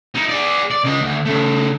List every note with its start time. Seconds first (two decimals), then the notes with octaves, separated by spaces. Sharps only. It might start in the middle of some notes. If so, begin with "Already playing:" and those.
0.15 D#4 E4
0.29 G#4 D5
0.71 D5
0.84 C#3 D#5
1.01 D2
1.26 C#3 A3